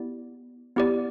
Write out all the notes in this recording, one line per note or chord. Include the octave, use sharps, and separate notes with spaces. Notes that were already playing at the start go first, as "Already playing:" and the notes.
Already playing: B3 E4 G4 D5
B3 E4 G4 D5